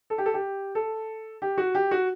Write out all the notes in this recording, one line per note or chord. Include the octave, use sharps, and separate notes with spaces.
A4
G4
A4
G4
A4
G4
F#4
G4
F#4